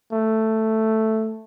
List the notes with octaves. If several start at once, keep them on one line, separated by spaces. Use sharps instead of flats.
A3